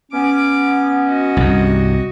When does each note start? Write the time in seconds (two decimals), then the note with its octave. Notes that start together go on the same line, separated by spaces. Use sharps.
0.12 B3 C#4 D6
1.07 F#4 D#5
1.37 C2 G2